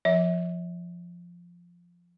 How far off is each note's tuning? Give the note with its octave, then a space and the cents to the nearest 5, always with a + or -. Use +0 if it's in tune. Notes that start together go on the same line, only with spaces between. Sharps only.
F3 +0 E5 -35